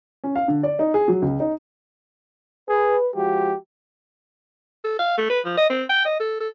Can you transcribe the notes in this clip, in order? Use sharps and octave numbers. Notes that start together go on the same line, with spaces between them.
C#4
F5
D3
D5
D#4
G#4
F#3
C#2
D#4
G#4 B4
F3 G#3 F#4 G4
A4
F5
A3
B4
F3
D#5
C4
G5
D#5
A4
A4